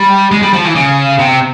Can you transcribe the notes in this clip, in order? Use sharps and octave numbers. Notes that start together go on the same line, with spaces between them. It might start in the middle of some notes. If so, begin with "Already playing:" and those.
Already playing: G3
G#3
G3
F3
E3
C#3
C3